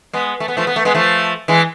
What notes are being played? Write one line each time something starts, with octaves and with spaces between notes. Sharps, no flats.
G#3 B3
A3
B3
F3 A3
B3
A3
G#3 B3
F3 A3
E3 G#3